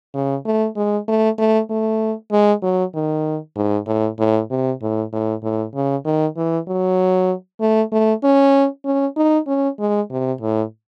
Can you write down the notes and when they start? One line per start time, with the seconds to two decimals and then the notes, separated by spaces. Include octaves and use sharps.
0.15 C#3
0.45 A3
0.76 G#3
1.08 A3
1.38 A3
1.70 A3
2.32 G#3
2.63 F#3
2.95 D#3
3.56 G#2
3.87 A2
4.19 A2
4.51 C3
4.82 A2
5.13 A2
5.43 A2
5.75 C#3
6.05 D#3
6.37 E3
6.67 F#3
7.60 A3
7.92 A3
8.24 C#4
8.85 C#4
9.17 D#4
9.47 C#4
9.79 G#3
10.11 C3
10.41 A2